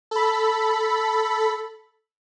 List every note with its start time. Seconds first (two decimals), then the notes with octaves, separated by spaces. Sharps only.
0.11 A4 B5